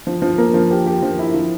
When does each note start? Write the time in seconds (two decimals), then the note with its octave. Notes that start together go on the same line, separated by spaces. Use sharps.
0.07 F3
0.22 F3
0.38 A#3
0.54 F3
0.71 G4
0.86 G4
1.03 F3
1.19 E4
1.34 F3